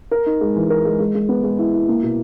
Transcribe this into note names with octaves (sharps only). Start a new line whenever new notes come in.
A#4
D#4
G#3
E3
A#4
G#3
G#3
G#3
B3
G#3
E4
E4
A#3
B2